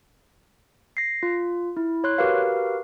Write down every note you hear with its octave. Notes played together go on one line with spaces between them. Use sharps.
A#6 C7
F4
E4
C#5 C6 F#6
F#4 G4 A#4 B4 F5